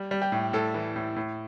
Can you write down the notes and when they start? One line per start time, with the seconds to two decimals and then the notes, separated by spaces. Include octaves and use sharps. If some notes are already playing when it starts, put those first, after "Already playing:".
Already playing: G3
0.11 G3
0.22 G4
0.32 A2
0.53 A2 A4
0.74 E3
0.96 A2
1.16 A2